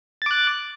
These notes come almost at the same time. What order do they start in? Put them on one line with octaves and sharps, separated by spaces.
A6 D6 F#6